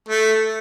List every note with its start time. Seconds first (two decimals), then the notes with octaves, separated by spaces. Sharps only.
0.08 A3